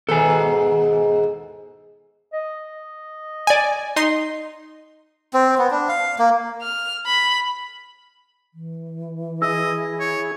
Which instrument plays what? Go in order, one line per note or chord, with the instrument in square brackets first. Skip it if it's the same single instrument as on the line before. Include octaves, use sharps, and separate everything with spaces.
[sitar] D#2 G#2 B2 [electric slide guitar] A4 G#5
[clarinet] D#5
[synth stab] D5 G#5
D#4 C6
[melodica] C4
B3
D4
F5
A#3
[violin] F6
B5
[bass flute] E3
[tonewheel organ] E4 G#4 [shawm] D#5 [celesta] E6
[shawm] C#5